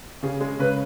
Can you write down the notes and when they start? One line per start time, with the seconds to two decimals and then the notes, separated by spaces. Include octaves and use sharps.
0.23 C#3 G#4
0.41 G#3
0.59 C#3 B4